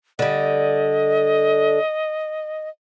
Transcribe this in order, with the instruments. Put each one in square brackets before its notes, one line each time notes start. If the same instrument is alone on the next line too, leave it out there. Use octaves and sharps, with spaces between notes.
[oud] D3 G3 [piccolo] D#5